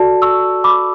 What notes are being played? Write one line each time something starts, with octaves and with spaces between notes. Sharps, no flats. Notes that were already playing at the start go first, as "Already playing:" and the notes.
Already playing: F#4 A4 D5 A5
C#6 E6
B5 D6